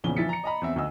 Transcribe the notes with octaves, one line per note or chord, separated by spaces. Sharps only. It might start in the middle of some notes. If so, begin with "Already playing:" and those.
A#1 E2 C#3 E3 G7
E3 F3 E4 A6 B6 C#7
A#5 C#7
D#5 A#5 B5
E2 C4 E5
D2 D#5 E6